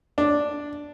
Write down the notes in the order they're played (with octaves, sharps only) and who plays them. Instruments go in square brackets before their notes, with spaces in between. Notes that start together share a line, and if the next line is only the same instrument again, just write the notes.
[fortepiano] D4